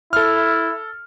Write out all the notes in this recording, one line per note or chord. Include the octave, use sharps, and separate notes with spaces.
E4 A4 F6